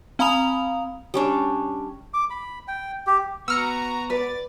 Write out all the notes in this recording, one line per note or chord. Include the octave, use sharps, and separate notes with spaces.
C4 F5 A#5 B5 D#6 F7
G3 C#4 D4
D6
B5
G5
G4
B3 F#4 A#5 C#6 E6 F6 C#7
B4 D5 A6